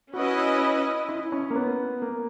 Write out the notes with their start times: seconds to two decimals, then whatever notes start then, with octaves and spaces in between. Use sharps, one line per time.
0.14 C#4 E4 F#4 B4 D#5
1.09 E4
1.32 C#4
1.50 A#3
1.56 B3
2.02 A#3